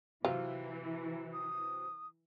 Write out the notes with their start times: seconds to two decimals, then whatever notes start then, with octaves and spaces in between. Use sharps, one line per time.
0.25 C3 E3 F#3 C4 F4
1.33 D#6